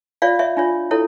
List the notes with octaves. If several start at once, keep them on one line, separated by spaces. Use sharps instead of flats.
F4 C#5 D5 F5
C#5 E5
D4 F4 C#5
E4 A4 C#5